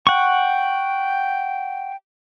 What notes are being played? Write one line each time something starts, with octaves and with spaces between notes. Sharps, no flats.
F#5 G5 C#6